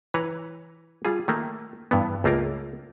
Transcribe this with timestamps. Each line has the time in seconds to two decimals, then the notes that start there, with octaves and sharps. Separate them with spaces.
0.14 E3 B4 C#5 A#5
1.05 G3 F4 G#4
1.28 D#3 A3 A#3
1.91 G2 E3 B3
2.24 C#2 A3 A#3 F4 A#4